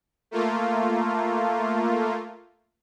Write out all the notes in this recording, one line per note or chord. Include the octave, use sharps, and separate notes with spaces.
A3 A#3 F4